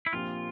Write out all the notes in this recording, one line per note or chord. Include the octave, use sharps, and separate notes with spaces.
E4
A#1 A#2 F3 C4 F4 G4